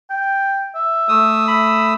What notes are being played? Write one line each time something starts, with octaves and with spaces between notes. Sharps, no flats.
G5
E5
A3 D#6 E6
B5